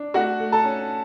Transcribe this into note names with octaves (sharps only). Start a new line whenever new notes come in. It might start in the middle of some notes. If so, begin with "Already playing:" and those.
Already playing: D4
A3 F#4 F#5
A3
A4 A5
C#4